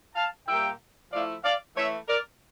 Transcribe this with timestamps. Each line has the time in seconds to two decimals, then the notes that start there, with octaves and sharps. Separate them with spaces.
0.16 F5 A5
0.47 A#2 G3 A#3 E5 G5
1.12 F3 A3 E4 D5 F5
1.43 D5 F5
1.76 E3 A3 E4 C#5 E5
2.08 A#4 D5